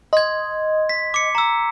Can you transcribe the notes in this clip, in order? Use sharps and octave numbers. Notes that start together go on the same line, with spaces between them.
D#5 C6 G#6
B6
D6 C#7
A#5 E6